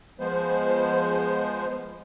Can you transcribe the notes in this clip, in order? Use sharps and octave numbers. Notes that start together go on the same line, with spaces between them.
F3 G#3 B3 C5